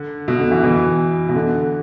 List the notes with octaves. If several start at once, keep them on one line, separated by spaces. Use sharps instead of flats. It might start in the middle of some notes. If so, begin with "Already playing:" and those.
Already playing: D3
B2
D3
B2 E3
B2 E3
B2
D3